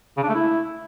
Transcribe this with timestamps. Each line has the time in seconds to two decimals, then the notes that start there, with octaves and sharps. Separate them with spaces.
0.17 C#3
0.23 D4
0.29 A3
0.35 E4